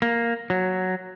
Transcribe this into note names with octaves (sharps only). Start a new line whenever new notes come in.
A#3
F#3